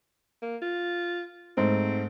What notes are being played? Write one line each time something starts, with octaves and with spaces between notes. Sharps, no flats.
A#3
F4
G#2 A3 C4